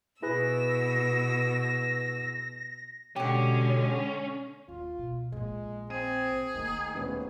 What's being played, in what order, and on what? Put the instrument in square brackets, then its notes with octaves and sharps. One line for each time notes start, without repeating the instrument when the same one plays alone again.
[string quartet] B2 E6 [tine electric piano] E4 G#4 B4 [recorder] A#6
[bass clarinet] B2 [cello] D3 G#3 [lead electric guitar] C#4 [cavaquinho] G4 F#5
[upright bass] D#2 [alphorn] F4
[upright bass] B2
[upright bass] A#1 A#2 [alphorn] G#3
[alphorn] C4 [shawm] G#4 [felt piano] D#7
[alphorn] D#3 [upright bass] A3 A#3
[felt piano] D#1 B3 C#4